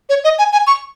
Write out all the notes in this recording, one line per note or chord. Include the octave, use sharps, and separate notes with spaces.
C#5
D#5
G#5
G#5
C#6